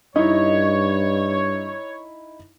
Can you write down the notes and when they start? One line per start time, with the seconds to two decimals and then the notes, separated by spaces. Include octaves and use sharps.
0.16 G2 D#4 E4 C#5 D#5